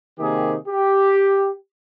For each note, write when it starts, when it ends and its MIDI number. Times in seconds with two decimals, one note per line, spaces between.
0.19 0.54 48
0.19 0.54 51
0.19 0.54 58
0.19 0.54 67
0.19 0.54 68
0.68 1.50 67